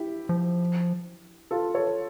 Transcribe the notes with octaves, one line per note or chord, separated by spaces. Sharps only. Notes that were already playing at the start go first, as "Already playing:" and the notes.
Already playing: E4 G4
F3
F4 A4
A4 C#5